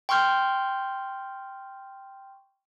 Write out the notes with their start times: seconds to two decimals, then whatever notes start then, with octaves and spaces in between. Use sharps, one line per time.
0.09 G5 C6 C#6 F6 G6